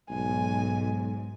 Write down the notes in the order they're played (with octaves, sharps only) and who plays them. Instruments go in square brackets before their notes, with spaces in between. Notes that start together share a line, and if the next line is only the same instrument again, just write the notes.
[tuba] B1 [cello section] G#2 [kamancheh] G#5